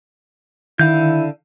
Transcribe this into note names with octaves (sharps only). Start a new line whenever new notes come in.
D3 D#3 E4 F5 G6